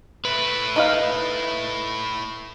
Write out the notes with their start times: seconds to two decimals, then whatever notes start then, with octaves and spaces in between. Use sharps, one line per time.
0.25 A3 E4 B4
0.76 D#4 D#5 F5